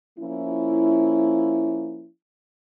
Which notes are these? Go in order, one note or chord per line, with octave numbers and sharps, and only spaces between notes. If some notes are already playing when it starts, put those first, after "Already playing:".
F3 A#3 C#4 E4